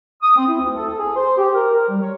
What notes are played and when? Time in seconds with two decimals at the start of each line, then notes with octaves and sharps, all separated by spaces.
0.22 D#6
0.36 C4
0.48 E4
0.61 D2
0.76 A4
0.98 G#4
1.16 C5
1.38 G4
1.54 A#4
1.74 A#4
1.89 G3
2.02 C#5